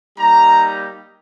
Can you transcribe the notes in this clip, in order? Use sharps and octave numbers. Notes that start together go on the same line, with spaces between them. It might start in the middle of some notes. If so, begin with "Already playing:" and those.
G3 A#3 D#4 G4 A#5